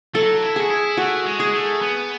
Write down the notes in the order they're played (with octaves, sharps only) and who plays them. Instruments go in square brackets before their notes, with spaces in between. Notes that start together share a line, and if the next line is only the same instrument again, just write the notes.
[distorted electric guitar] F#3 [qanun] A4
[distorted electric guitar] E4
[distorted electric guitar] F#4 [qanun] G#4
[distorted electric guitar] E4
[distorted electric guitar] A3 [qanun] F#4
[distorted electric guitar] G#3
[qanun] G#4
[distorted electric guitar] A3
B3